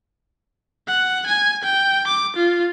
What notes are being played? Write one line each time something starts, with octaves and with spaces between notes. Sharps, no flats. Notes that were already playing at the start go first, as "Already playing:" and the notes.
F#5
G#5
G5
D6
F4